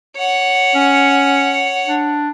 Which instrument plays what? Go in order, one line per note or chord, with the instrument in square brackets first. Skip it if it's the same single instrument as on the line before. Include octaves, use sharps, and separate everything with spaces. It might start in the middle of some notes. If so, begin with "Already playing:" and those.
[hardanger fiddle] C#5 F#5
[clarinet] C#4
D4